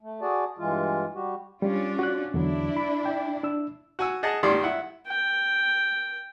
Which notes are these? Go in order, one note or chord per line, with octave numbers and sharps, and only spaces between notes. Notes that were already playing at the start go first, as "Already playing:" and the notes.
A3
F#4 G#4 D5 A5
G2 E3 G#3 F4
G3 F#4 G4
G3 C#4 D4 F4
F#4 F#6
E2 D3 F#3 D4 E4
B5
G5
D4 E6
F#4 G#5 E6
G#4 D#5 F#5 A5
G2 D#3 G3 D5 C6
E4 F#5
G5